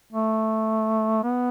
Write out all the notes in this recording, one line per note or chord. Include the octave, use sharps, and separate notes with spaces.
A3
B3